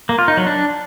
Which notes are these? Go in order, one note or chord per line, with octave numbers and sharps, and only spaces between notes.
A#3
F4
D#4
F#3
D4